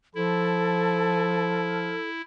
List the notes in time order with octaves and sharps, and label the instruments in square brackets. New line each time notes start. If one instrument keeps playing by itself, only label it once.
[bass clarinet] F3 [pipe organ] E4 [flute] A4